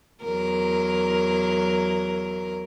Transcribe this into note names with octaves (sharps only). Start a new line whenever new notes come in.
E2 F#3 A#4